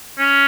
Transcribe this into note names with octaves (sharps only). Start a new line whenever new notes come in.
C#4